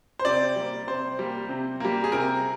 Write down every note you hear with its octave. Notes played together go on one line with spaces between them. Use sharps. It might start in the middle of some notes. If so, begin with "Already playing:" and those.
C5
C3 D5
G3 A#3
C3 C5
G3 A#3
C3
G3 A#3
G#4
C3 A#4